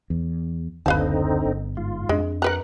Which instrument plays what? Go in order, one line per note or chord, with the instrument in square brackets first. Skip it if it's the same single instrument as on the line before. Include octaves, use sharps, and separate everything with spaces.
[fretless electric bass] E2
[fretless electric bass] F#1 D2 [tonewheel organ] D3 C4 D#4 [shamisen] B4 F5 A5
[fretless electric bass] G1
[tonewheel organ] G#2 F4
[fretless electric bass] F2 D4 [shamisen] G#3
[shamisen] A#4 B4 A#5 [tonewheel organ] F#5 F#6